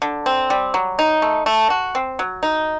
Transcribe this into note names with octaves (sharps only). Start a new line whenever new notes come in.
D3
C4
G3
F#3
D#4
A3
A3
F#4
C4
F#3
D#4